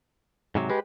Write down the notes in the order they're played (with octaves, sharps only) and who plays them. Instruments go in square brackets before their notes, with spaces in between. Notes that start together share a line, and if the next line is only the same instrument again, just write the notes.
[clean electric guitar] G#2 C3 F#3
[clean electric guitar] G#3 [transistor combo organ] G4 B4